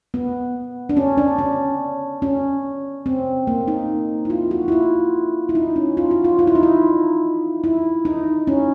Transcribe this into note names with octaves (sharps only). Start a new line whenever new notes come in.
B3
D4
C#4
D4
C#4
C#4
C4
A#3
D#4
E4
F4
F#4
E4
F4
E4
D#4
C#4
F4
F#4
F4
F4
E4
D#4
E4
E4
D#4
C#4